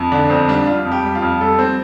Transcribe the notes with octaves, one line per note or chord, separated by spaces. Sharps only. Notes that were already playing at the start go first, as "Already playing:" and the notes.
Already playing: F2
D3 D4
F2 C4
G3 D4
G3 F4
F2
G4
G3
F4
F2
G3 A4
C4